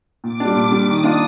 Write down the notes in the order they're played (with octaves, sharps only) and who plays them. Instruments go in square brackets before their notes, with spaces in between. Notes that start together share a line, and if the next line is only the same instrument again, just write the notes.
[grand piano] A#2 [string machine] D6
[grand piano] G3 D4
A#2
G3 D4
[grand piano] D#3 [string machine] D#6
[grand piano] A#3 D4 F4